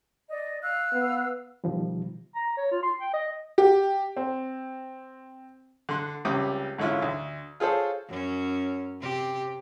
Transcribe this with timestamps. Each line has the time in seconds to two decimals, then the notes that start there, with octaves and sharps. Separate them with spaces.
0.30 D5 D#5
0.63 F5 E6 F#6
0.93 B3
1.64 B2 D#3 F3 G3
2.36 A#5
2.57 C#5
2.71 F4
2.83 C6
3.00 G5
3.14 D#5
3.58 G4
4.17 C4
5.89 D3 C6 F#6
6.25 C#2 C3 G3 G5 D6 D#6
6.78 G#2 D3 C#4 E4 F4
7.02 D2
7.60 F4 G#4 A4 C5 C#5
8.08 F#2 C#4
9.00 C3 G4